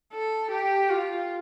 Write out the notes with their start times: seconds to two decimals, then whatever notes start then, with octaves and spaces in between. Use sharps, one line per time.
0.13 A4
0.51 G4
0.90 F4